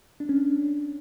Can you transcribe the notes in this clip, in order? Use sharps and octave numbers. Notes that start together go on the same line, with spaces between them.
D4
C#4
D4